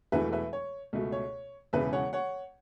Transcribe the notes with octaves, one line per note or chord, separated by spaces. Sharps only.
E1 E2 B2 A3 E4 B4 E5
B4 E5
C#5
C#2 B2 A3
C#5
E1 E2 C#3 B4 E5
C#5 F#5
C#5 F#5